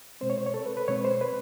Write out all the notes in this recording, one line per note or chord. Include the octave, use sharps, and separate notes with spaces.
B2 G#3 C4 C5
C#5
C5
C#5
A4
B4
B4
B2 G#3 C4 C#5
C5
B4